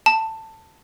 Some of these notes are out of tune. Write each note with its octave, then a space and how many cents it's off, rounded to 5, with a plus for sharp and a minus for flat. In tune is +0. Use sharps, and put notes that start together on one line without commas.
A5 +15